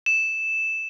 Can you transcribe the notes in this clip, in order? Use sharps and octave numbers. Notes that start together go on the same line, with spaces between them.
E7